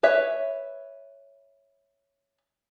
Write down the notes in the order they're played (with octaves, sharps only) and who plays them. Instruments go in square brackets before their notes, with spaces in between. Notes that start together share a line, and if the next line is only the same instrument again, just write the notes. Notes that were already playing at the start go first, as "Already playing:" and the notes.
[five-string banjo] B4 C#5 E5